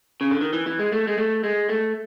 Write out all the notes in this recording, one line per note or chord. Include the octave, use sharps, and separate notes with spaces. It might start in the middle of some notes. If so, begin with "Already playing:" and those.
C#3
D3
D#3
E3
E3
G#3
A3
G#3
A3
G#3
A3